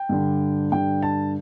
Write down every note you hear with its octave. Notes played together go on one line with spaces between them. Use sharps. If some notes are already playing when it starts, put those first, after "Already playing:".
Already playing: G5
G2 D3
G2 D3 G5
A5